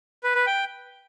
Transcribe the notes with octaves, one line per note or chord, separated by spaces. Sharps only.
B4
B4
G5